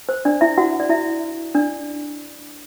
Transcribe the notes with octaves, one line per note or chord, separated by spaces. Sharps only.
C5
D4 D5
E4 E5
F#4 F#5
D5
E4 E5
D4 D5